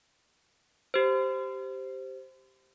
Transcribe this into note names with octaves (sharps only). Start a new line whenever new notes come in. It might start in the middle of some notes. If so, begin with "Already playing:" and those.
G4 C5